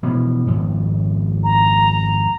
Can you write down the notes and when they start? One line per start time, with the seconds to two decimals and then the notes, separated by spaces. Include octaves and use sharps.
0.03 B2 E3 F3
0.47 G#1 F2
1.44 A#5